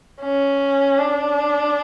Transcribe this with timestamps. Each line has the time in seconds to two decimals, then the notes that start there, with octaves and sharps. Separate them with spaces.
0.21 C#4
0.98 D4